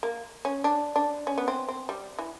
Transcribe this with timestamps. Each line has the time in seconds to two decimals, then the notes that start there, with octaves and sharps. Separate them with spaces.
0.03 A#3
0.45 C#4
0.64 D4
0.96 D4
1.27 C#4
1.38 B3
1.48 C4
1.68 C4
1.89 G3
2.19 E3